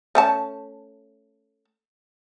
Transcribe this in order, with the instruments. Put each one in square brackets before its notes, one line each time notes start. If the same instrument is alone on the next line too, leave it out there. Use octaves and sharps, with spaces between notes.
[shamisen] A3 C#4 A5